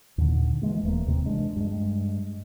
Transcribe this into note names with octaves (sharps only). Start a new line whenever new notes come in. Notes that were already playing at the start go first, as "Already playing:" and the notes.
D#2 A#2 D3
E3 F3 G#3 A#3
D#1 E3 A3 A#3
D#2 C3
E3 G#3 D4
G2 G#3